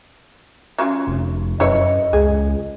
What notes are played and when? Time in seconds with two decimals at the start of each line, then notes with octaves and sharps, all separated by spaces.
0.78 F#3 C#4 F4
1.07 F1
1.60 F#2 E4 B4 C#5 D#5
2.13 C#2 G#4